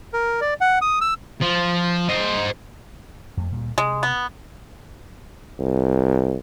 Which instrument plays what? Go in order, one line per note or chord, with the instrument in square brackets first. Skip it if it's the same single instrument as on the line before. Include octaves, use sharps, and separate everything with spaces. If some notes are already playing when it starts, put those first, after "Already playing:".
[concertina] A#4
D5
F#5
D#6
E6
[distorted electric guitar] F3
C5 D#5
[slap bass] F2 A3
D2 A#2 G3
[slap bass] C3 [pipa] G#3
[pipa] B3
[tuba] C2